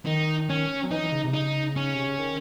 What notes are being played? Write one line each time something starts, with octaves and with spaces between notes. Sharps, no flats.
D#3 D#4
C#4
F#3
E3 D#4
E3
C#3
C3
C#3 D#4
C#4
C3
C#3
D#3